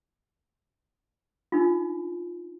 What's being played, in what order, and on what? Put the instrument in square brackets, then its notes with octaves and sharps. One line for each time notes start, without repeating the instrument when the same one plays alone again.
[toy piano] D4 D#4 F4